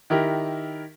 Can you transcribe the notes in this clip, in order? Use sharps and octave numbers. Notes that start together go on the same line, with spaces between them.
D#3 E4 G4 A#4